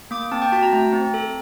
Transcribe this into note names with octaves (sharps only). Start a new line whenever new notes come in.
A#3 D6
C4 A5
G5
F#4 A5
A#5
A3
C4
A4